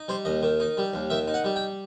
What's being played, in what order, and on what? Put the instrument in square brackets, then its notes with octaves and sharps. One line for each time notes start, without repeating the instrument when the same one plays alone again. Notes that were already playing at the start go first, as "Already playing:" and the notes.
Already playing: [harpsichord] D#4
G3 C5
D#2 D#5
D#3
D#4
G3
D#2
D#3 E5
D#4
F#5
G3
G5